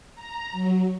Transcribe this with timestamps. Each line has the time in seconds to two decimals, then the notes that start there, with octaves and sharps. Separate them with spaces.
0.15 A#5
0.52 F#3